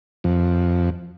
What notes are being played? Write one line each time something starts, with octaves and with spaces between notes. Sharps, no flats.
F2